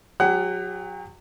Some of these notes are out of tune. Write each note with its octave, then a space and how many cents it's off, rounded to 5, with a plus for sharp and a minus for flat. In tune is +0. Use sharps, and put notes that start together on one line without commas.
F#3 -15 G4 +45 F#5 +25